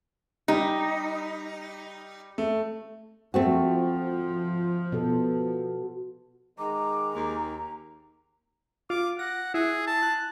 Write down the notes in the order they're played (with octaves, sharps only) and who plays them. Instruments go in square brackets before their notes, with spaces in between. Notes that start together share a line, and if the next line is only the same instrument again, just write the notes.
[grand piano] G3 G4 [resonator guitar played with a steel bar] D#4
[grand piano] A3
[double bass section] F3 [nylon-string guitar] A3 C4 F#4
[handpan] B2 A4
[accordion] D#3 G#3 [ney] A#5 [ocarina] D6
[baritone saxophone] D#2
[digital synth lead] F4 [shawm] D6
[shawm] F#5 [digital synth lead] A#6
[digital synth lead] E4 [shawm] G#4
[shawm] A5
[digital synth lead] F#6